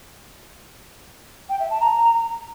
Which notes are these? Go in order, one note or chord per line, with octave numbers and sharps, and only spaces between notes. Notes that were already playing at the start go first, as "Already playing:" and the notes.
G5
E5
A5
A#5